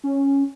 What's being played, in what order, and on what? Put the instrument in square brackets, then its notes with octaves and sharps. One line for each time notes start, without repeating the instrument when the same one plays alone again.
[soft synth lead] C#4